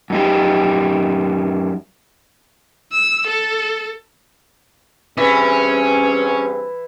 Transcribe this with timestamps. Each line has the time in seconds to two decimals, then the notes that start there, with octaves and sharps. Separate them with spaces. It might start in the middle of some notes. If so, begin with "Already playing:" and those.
0.10 F#2 D#4 G4
2.92 E6
3.28 A4
5.17 G2 E3 C4 C#4 G#4 E5